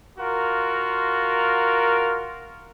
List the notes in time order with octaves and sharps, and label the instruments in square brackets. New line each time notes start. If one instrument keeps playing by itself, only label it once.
[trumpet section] F4 F#4 A#4